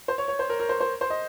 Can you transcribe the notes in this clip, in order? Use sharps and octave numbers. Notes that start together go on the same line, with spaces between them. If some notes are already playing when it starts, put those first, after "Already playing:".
C5
C#5
C#5
C5
A#4
A#4
C5
C5
C5
D#5